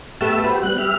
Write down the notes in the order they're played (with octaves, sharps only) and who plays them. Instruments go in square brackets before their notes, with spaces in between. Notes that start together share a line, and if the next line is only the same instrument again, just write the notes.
[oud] A3 B3 G4 [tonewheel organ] E5 A5 E6
[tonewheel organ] F#4 G4 C5 [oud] B4
[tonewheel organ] G3 B3 F#6
G4 E5 F6